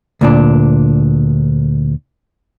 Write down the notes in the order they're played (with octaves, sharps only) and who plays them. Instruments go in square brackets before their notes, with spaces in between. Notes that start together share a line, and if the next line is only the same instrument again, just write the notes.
[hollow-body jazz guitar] D2 A#2 D4